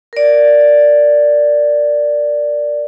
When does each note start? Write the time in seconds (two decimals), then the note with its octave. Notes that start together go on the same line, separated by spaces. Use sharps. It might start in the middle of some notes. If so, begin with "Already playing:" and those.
0.13 A#4 D5